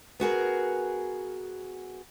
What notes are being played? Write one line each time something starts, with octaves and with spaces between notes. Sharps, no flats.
B3 F#4 G#4 A#4